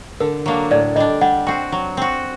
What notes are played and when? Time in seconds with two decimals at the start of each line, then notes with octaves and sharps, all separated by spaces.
0.20 D3 A#4
0.46 F#3 A#3 D4
0.71 A2 D5
0.96 G3 D4 D#5
1.21 G3 F#5
1.47 C4 F#4 G5
1.72 F#3
1.97 C4 F#4